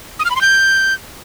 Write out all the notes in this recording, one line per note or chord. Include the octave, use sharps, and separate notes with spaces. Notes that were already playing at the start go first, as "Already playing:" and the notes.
D#6
F6
B5
C6
G6